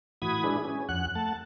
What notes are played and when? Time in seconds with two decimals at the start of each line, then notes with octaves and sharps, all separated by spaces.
0.22 A2 E3 F#4 B5 D#6 G#6
0.44 G#3 D4 E4 G#4 B4
0.65 C#4 G#4
0.89 F2 F#5 F#6
1.15 A3 F#5 A5